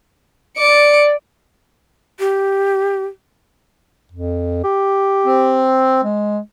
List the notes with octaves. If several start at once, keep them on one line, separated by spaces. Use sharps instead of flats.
D5 D6 C#7
G4
F2
G4
C4
G#3